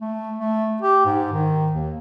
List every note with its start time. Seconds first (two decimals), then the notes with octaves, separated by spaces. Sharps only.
0.01 A3
0.39 A3
0.82 G4
1.06 G#2
1.33 D#3
1.72 D#2